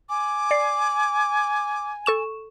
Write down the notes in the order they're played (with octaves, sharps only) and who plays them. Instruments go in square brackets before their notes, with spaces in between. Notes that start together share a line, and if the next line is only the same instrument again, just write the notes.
[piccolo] G#5 [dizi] D6
[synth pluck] D5 C7
A4 C#6 E7